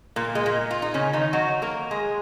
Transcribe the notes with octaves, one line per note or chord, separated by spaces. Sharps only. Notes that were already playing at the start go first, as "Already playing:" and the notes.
A#2 A#3
G#3
A#2 A#3
F4
D#4
C#3 C#4
D#3 D#4
F#3 F#4
A#3 A#4
G#3 G#4